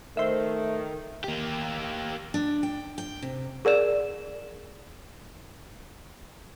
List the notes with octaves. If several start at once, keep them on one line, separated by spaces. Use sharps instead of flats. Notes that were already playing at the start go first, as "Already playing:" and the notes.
D#3 A3 C5 E5
A#3 G4
D4
G5
G5
C3
G#4 A#4 D5 E7